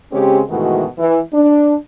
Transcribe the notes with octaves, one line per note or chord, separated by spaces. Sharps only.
C#3 G#3 C4 C#4 G4
G#2 B2 D#3 E3 A3 F#4
E3
D4